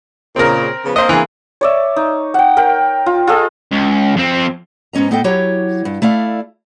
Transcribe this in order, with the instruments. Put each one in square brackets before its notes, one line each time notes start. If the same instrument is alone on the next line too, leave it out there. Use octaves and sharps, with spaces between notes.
[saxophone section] A#2 C#3 [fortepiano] C4 A#4
[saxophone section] C#3 F3 B3
[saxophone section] A#3 C4 [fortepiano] C5 D#5
[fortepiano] E3 G#4
[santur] C#5 D5 E5
D#4
F#5 G5
A#4 G5
F4
F4 G#4 A4 D#5
[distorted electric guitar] C#2
F2 C4
[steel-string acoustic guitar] G#2 B3 C#4 D#5 A#5
A2 B3 A4 D#5 G5
F#3 E4 G4 C#5
G2
A3 E4 D5 F5